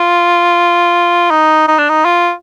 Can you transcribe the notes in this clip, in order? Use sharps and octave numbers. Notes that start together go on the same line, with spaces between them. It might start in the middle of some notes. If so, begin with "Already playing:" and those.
Already playing: F4
D#4
D#4
D4
D#4
F4